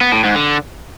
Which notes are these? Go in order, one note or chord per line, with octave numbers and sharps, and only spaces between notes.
B3
A2
G#2
D3